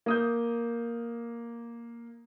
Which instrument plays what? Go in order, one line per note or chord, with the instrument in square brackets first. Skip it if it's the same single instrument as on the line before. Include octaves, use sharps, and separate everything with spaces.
[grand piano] A#3 D#6 G6